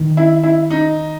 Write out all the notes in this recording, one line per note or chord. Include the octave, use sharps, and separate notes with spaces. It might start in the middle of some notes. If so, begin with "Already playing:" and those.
Already playing: D#3
E4
E4
D#4